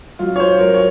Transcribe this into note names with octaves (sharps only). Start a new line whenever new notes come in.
F#3 F4
C#5
C5
F#3 A#4
C#5